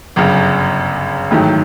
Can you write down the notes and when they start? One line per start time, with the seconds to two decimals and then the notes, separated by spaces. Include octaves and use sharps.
0.16 G1 F#2 C#3
1.31 A1 G#2 D#3 F#3 A3